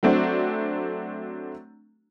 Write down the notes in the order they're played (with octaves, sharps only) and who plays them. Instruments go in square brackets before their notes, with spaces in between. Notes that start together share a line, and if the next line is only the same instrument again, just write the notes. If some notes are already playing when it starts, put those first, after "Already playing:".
[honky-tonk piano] F#3 A3 C4 D4 F#4